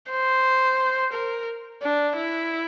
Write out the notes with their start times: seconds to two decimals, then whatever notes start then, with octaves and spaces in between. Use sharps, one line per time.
0.11 C5
1.13 A#4
1.83 D4
2.17 E4